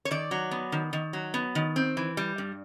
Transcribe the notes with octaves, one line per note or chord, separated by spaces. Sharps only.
C#5
D#3 D5
F#3
B3
D#3
D#3
F#3
B3
D#3
C4
E3
G3
G2